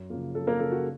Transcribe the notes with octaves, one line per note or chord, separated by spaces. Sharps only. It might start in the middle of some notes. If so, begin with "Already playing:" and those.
Already playing: F#2
C#3 F3 A#3
F#2 A4
A#3 A#4
C#3 F3 A#3 A4
F#4